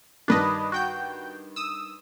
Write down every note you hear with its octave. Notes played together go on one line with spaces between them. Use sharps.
G2 D#3 D4 B4 D#5
F#4 G5 G6
D#6 E6